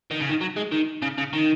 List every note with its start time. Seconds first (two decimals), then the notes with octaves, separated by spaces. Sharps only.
0.11 D#3
0.21 C#3
0.30 D#3
0.41 F#3
0.57 G#3
0.72 D#3
1.02 C#3
1.18 C#3
1.33 D#3